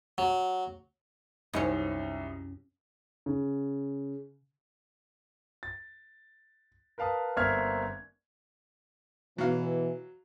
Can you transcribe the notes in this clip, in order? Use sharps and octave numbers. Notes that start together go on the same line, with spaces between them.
F#3
C2 F#2 C3 C#4 D#4
C#3
A6
A#4 B4 F5 A5 D#6
G1 A#3 C4 E5 F6 G#6
B2 E3 F#3 F5